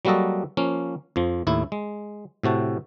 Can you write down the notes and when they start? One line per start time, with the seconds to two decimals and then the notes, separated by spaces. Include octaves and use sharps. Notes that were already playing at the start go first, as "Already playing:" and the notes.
0.05 F#3 G3 A#3 F#4 A4 D#5
0.57 F3 A#3 C#4
1.16 F2 F3
1.47 D#2 A2 E4
1.72 G#3
2.43 A2 C3 F#4 A5